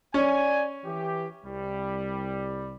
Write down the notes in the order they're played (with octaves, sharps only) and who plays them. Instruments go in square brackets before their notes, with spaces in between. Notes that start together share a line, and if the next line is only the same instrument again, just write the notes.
[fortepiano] C#4 [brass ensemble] D5 G#5
[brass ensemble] E3 G4
C2 G3